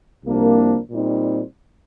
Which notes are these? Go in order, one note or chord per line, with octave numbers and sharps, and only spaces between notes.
C2 C3 F3 A#3 D4
A#2 G3 C4 D#4